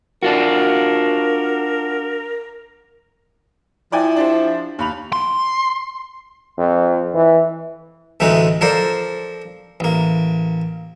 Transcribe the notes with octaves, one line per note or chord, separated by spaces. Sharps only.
D4 F4 F#4 A#4
F3 E4 D5 G5 G#5
D4 G4 C5
D#2 B5 F7
C6
F2
E3
A1 D2 G#3 A3 D#4
F3 A4 A#4 C5 D5
A1 A#3